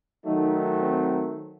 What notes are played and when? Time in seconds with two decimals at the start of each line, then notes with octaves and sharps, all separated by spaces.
0.24 D#3 F#3 A3 D#4
0.79 C4